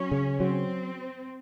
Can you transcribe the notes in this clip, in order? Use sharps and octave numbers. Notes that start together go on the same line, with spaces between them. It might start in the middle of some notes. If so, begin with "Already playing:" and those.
Already playing: F#3 C#4
C#3
F#3 C4